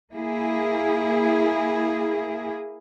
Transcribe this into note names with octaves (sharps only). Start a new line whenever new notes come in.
A#3 E4 G#4